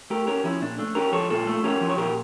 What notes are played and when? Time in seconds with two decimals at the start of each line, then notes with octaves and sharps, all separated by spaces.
0.10 A3 G4 A#4
0.27 C#4 G4 A#4
0.44 F3 C#4 E4
0.62 A#2 D4
0.78 A3 D4
0.95 C#4 G4 A#4
1.13 F3 A4 C#5
1.30 A#2 F4 A4
1.47 A3
1.64 C#4 G4 A#4
1.81 F3
1.89 C#5
1.98 A#2 G4 A#4